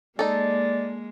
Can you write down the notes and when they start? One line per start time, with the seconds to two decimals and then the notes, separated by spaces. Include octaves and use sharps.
0.19 G#3 A#3 D#4 A4 D5